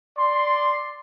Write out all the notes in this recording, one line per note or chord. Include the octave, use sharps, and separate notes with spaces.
D5 C6